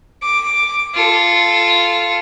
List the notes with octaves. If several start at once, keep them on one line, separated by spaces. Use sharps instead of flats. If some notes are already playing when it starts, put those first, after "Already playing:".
D6
F4 A4